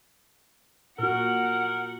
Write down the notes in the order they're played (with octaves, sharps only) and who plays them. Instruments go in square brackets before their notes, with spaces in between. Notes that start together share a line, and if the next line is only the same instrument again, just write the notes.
[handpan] A#2 F#4 [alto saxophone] A#4 [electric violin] F#5